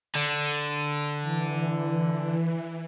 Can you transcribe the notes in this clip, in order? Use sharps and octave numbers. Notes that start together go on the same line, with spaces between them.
D3
E3